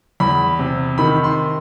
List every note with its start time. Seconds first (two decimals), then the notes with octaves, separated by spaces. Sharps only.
0.20 E2 B5
0.59 C3
0.98 D#3 B5
1.24 C6